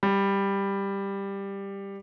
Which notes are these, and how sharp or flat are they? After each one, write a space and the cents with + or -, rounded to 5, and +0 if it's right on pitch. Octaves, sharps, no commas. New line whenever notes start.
G3 +10